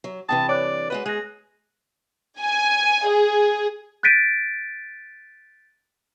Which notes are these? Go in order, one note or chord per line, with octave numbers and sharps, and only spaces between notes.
F#3
G2 C3 E3 G5 A5 D#6
C#5 D5 D6 F#6
G#3 F#4 B4 D#5
G#3 G#4 F#6 A#6
G#5
G#4
F#6 G6 A6 B6 D7 D#7